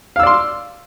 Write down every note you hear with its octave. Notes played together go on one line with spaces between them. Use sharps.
D5 F5 C6 E6